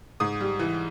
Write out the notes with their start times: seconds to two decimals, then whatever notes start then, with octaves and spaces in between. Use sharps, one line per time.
0.20 G#2 D#6
0.40 G3
0.59 E3